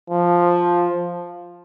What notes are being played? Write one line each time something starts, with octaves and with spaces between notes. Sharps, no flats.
F3